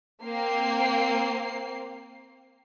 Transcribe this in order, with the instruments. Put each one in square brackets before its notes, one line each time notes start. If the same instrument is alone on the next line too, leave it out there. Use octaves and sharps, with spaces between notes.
[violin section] A#3 C4 C7